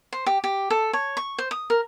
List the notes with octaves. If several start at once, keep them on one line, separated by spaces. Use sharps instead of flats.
C5
G4
G4
A4
C#5
C#6
C5
D#6
A#4